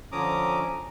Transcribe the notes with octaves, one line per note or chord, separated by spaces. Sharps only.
D3 F3 C#4 A#5 D6 D#6